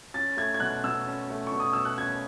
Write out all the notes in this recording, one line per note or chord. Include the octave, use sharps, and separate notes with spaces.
C#4 A6
A3 G#6
G#6
B2 F#6
B2 E6
C#4
A3
B2 C#6
D#6
B2 E6
F#6
C#4 G#6